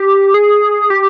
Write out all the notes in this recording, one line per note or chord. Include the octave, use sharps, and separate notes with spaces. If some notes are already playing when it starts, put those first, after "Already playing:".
Already playing: G4
G#4
G4